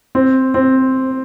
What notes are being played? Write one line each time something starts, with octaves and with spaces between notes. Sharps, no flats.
C4
C4